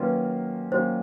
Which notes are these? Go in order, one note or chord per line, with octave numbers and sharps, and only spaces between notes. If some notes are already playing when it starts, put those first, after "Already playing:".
Already playing: D#3 F#3 A#3 C#4 F4 B4
D#3 F#3 A#3 C#4 F4 C5